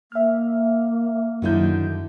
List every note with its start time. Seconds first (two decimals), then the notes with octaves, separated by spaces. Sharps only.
0.12 A#3 E5 F6
1.42 F#2 D3 D#3 F#3 E4 G6